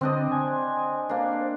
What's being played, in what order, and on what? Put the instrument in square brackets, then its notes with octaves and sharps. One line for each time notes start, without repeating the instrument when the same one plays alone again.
[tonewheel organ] D3 [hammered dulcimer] C4 D4 D#5
[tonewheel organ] G#5
[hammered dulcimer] A#3 D4 [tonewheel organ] C5